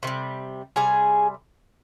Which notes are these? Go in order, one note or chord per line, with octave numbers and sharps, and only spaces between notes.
C3 D#3 G3
C3 G3 G#4 G#5